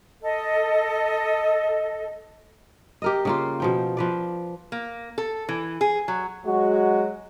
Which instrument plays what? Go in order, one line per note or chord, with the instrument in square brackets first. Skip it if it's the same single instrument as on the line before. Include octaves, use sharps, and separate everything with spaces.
[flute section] A4 D#5
[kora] G4 A#4 D#5
C#3 A#3 F4
B2 F3 G5
F3 B4 D5
[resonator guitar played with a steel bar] A#3
A4
E3
G#4
F#3
[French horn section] F#3 G#3 F#4